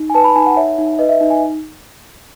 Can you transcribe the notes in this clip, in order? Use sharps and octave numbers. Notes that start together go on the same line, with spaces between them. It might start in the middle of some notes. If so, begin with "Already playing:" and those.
Already playing: D#4
G#5
B4 A5
B5
D#4 G#5
F#5
C#5 E5
D#4
B4 D#5
E5
D#4
G#5